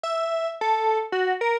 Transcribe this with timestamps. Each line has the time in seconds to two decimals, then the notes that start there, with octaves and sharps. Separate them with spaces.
0.03 E5
0.61 A4
1.12 F#4
1.41 A#4